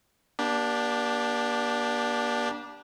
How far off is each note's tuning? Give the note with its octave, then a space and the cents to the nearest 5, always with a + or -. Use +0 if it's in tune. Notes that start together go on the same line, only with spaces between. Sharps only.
A#3 +40 D4 -5 G4 +0